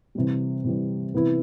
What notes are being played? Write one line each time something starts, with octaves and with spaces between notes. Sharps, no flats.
C3 E3 G3
C3 E3 G3
C3 E3 B3 E4